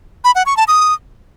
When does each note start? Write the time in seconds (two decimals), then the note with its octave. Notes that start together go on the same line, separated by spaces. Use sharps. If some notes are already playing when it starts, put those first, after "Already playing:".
0.24 B5
0.35 F#5
0.46 C#6
0.57 A5
0.68 D#6